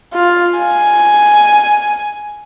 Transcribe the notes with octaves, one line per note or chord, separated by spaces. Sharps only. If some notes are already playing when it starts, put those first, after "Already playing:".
F4
G#5